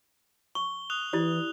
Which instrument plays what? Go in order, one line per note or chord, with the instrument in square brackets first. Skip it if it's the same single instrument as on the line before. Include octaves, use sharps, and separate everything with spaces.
[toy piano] C#6 [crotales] G7
[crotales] D#6 F#6 F7
[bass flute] E3 [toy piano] E4 G4 D5